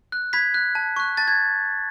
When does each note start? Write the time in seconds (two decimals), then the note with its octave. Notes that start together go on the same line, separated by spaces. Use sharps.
0.12 F#6
0.33 B5 G#6 B6
0.54 F#6
0.75 A5
0.96 C#6 F#6
1.17 A5 A6
1.28 G#6